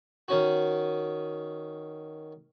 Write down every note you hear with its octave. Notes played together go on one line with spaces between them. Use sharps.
D#3 C#4 F#4